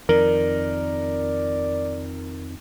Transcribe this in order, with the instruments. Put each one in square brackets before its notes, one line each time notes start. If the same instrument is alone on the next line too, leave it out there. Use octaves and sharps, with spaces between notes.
[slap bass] F2 D#3 [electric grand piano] A#4 [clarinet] D5